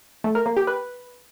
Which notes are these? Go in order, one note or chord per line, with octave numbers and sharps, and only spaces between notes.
A3
A#4
A#3
G4
B4